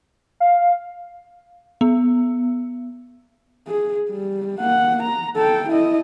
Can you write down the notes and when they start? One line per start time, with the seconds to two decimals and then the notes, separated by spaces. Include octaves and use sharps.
0.40 F5
1.81 B3
3.67 G#4
4.10 G3
4.60 A#3 F#5
5.03 A#5
5.36 A4 G5
5.69 E4 D#5